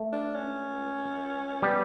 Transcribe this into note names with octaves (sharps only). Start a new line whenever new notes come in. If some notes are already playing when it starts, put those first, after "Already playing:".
Already playing: A3
D4
C#4
G3 B3